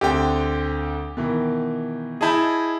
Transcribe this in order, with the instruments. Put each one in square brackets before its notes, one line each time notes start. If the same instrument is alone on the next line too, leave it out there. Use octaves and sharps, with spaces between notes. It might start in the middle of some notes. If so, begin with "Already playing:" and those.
[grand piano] D2 D3 C4 [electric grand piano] G4 G5
[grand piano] B2 D#3 E3
[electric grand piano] E4 G#4 [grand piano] D#5 A5 G6